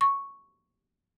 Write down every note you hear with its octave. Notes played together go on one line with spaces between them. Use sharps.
C#6